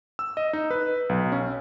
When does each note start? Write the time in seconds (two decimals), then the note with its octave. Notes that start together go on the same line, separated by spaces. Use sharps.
0.19 E6
0.37 D#5
0.53 D#4
0.71 B4
1.09 B1
1.32 C#4